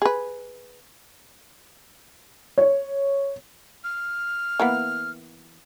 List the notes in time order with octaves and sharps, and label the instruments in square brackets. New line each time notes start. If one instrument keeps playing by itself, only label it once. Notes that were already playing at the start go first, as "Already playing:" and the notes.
[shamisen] G#4 B4
[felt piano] C#5
[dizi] F6
[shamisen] E3 A#3 B3